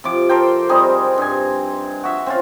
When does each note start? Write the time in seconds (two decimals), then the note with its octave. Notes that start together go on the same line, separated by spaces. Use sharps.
0.04 C3 F3 D6
0.29 A4 A#4 C5 G5
0.69 G3 C4 D#4 G#4
1.18 G2 G#5
2.04 F#4 E5
2.26 C4 C#4 F4